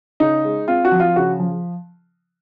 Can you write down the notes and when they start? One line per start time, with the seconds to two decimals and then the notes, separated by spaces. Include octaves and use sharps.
0.20 C#3 D#4
0.45 G#3
0.68 C4 F4
0.85 F#4
0.92 F3
1.00 F4
1.16 C#3 F#4
1.40 F3